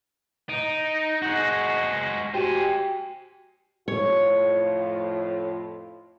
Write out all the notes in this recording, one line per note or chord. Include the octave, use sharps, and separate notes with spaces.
D#4 D7 D#7
G#3 F#4 G6 A#6
F#4 G4 C5 G5 G#5
F2 A2 F4 C#5